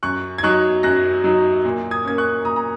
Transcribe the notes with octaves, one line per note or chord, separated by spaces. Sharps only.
F#2 C#6 F#6
G#6
F#3 D#4 C#6 F#6
F#2 F#6 A#6
F#3 D#4
A#2
D#6 G#6
A#3 C#4 G#6
C#6 F#6
A#2 A#5 D#6
A#5